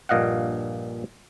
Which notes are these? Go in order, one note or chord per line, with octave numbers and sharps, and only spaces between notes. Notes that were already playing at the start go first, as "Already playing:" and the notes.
A#1 G2 A#2 D#5 F5 F#5